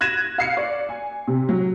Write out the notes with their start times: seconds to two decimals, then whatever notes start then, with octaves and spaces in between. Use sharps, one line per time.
0.01 F#6 G#6 A#6 D#7 E7
0.38 F5 C7 C#7
0.57 D5
0.89 G#5
1.27 C3
1.49 F#3